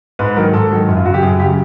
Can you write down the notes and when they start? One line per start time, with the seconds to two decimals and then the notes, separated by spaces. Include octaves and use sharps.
0.19 G#2 B4
0.36 D#3 F#3 A#4
0.54 G#2 A4
0.71 D#3 F#3
0.88 F#2
0.97 F4
1.05 C#3 F#3 F#4
1.14 G4
1.23 F#2 G#4
1.40 C#3 F#3 G4